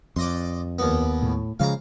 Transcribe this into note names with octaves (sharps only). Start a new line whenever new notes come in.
F2 D5 D#5 C6
D#2 B3
A2
C#3 F3 G#3 F5 A#5